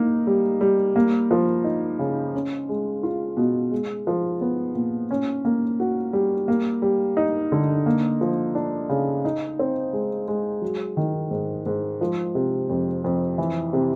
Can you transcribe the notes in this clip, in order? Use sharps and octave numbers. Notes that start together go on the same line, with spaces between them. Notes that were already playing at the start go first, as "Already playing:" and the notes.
Already playing: A#3 D#4
G3
G3
A#3
F3
D#4
C#3
C#4
G#3
F4
B2
G#3
F3
B3
A#2
C#4
A#3
F#4
G3
A#3
G3
D#4
D3
A#3
F3
D4
C#3
D#4
C4
G#3
G#3
F#3
D#3
G#2
G#2
F3
C3
F2
F2
E3
C3